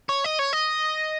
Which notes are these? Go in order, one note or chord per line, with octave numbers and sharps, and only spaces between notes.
C#5
D#5
C#5
D#5